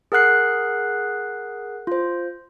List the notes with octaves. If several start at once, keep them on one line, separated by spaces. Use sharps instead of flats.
G#4 A#4 F#5 F#6 C7
F4 C5